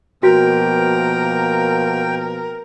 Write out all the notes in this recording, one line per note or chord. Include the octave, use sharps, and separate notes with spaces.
B2 F3 A#3 F#4 A#4 G5